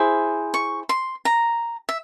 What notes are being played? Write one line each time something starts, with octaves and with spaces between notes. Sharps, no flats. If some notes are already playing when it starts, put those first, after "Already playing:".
Already playing: E4 G#4 C5
C#6
C6
A#5
E5